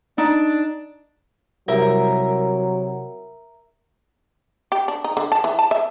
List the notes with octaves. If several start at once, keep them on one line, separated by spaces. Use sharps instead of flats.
D4 D#4
C2 F#3 A#4 E5
G4
D4
D#4
D3
A5
E3
A5
E5